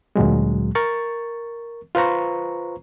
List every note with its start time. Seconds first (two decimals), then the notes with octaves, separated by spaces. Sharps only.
0.16 D2 A#2 F#3 G#3
0.75 A#4 C#6 A6
1.95 F4 B4 C5 A#5 C#6